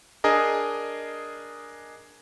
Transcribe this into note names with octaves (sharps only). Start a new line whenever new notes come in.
D4 G#4 A#4 D#5